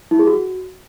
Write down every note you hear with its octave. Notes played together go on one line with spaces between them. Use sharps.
E4
G#4
F#4